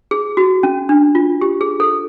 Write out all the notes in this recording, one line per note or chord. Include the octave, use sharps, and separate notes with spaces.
G#4
F#4
C#4
D4
F4
G4
G#4
A4